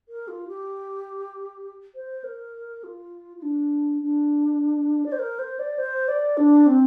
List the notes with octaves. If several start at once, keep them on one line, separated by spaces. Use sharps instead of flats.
A#4
F4
G4
C5
A#4
F4
F4
D4
D4
D5
C5
A#4
C5
D5
C5
D5
D4
C4